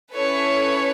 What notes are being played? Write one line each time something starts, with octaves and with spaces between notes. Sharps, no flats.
C#4 E4 A4 B4 C#5